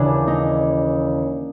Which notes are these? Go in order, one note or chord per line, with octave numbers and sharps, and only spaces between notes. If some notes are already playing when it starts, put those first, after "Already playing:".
Already playing: D#2 C#3 E3 D4
D#4